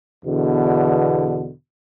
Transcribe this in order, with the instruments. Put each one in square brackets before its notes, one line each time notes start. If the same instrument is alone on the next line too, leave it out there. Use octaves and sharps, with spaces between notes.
[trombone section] E2 B2 D3